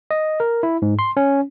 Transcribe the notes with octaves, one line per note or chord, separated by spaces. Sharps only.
D#5
A#4
E4
G#2
C6
C#4